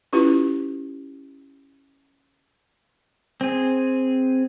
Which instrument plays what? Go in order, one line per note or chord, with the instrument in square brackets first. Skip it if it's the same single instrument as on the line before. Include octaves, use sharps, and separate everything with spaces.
[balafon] C#4 E4 F4 G4 B4
[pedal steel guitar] C4 G#4